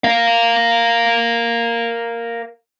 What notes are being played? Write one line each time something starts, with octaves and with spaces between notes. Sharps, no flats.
A#4 F5